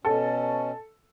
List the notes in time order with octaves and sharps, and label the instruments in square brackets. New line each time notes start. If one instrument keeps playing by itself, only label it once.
[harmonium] B2 C#4 [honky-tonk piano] A4